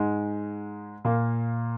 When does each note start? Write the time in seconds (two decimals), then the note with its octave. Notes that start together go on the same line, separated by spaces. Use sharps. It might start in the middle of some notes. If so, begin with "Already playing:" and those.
Already playing: G#2 G#3
1.05 A#2 A#3